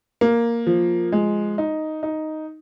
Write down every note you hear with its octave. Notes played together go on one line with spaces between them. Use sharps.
A#3
F3
G#3
D#4
D#4